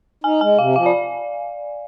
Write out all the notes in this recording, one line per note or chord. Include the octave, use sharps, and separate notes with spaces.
D#4 G#5
G#3 G#5
C3 F5
F3 F5
D5